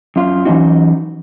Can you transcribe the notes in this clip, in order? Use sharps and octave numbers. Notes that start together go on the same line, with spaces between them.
F#2 F4
E3 F#3 C#4 D#4 F#4